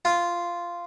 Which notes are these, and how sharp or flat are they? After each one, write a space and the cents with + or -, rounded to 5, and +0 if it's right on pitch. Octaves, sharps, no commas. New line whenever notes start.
F4 -5